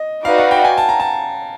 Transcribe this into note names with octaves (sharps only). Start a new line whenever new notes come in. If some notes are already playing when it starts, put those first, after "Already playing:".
Already playing: D#5
D#4 F#4 B4 D5 F5
F#5
G5
G#5
A5
A#5
A5